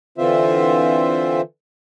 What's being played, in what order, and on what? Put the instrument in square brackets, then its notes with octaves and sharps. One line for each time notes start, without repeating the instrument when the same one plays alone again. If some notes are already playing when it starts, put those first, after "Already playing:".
[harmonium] D3 E3 C4 F4 C5 E5